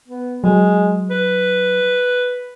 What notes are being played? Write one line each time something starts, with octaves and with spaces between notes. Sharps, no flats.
B3
F#3 G#3
B4